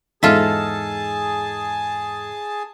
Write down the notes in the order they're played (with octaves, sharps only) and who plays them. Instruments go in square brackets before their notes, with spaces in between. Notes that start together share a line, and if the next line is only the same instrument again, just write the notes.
[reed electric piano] E2 G#2 [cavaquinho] D#4 A4 [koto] F4 E5 [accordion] G#4 A5